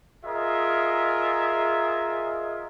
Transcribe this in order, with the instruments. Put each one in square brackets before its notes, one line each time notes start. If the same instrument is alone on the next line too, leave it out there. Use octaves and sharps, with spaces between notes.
[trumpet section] F4 G#4 A#4 D#5 E5